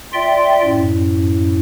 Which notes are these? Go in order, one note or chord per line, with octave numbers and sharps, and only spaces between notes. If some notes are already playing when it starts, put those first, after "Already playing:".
F4 D5 E5 G5 C6
F#2 A2